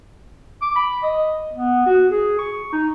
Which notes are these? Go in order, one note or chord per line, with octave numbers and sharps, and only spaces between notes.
D6
B5
D#5
B3
F#4
G#4
C#6
D#4